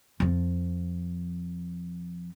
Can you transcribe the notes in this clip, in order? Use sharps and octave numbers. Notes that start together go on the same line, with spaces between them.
F2 F3